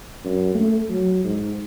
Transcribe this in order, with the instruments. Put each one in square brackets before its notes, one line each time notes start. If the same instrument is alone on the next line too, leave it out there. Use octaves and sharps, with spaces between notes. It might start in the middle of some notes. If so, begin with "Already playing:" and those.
[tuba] F#2
A3
F#3
G#2